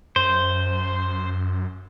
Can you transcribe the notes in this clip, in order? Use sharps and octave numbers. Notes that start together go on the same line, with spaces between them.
F#2 C5